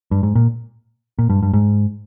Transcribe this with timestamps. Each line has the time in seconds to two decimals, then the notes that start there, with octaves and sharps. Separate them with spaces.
0.11 G2
0.23 G#2
0.35 A#2
1.19 A#2
1.30 G2
1.43 G2
1.53 G#2